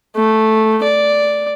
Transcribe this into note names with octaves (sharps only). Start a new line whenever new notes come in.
A3
D5